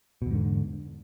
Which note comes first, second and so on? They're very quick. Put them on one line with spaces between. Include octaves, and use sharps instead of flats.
B2 E2 G#2 D3